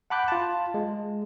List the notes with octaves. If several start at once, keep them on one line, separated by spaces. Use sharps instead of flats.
F#5 A5 B5 D6 F#6 G6
F4 A5
G#3